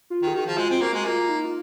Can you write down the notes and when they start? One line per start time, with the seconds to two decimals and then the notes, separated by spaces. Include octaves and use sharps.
0.10 F4
0.22 D#3
0.27 G#4
0.35 D#3 F#4
0.47 F3
0.57 G#3 F4
0.70 C4
0.82 A#3 F#4
0.94 G#3
1.05 A#3 F4
1.29 D#4
1.45 F4